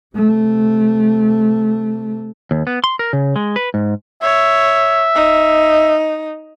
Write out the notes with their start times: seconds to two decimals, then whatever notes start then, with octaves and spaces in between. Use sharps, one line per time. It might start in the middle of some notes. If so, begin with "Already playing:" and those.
0.16 C3 A3
2.51 D#2
2.67 B3
2.84 C6
2.99 A#4
3.13 C#3
3.36 G#3
3.56 B4
3.74 G#2
4.22 C#5 E5
5.15 D#4